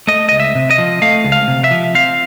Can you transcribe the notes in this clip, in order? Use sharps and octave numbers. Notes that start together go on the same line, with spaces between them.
A3 D#5
C#2 D#5
E5
C3
D#5
F3
A3 F5
C#2
F5
C3
E5
F3
C4 F5